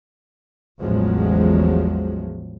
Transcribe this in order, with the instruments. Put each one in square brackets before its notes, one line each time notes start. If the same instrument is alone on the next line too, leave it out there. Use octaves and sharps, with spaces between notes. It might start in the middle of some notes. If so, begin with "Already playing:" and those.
[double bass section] A1 E2 F3 F#3 G#3